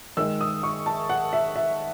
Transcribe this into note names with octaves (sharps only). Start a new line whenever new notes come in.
D#3 G#3 E6
D#6
C#6
A5
F#5
E5
E5